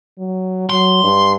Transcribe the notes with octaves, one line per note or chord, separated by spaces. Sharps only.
F#3
F#3 C6
G2